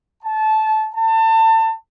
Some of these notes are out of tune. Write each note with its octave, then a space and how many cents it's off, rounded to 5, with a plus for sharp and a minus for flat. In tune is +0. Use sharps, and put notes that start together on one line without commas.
A5 -20
A5 +30